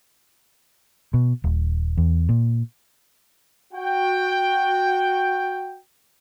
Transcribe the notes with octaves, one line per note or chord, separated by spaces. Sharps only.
B2
D#1
E2
A#2
F#4 G5